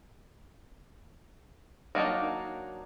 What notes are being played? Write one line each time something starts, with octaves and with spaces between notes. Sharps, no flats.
F#3 A#3 D4 D#4